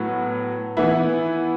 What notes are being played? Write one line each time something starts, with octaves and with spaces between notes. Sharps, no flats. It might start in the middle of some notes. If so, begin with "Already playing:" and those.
Already playing: A2 F#3 B3
E3 B3 E4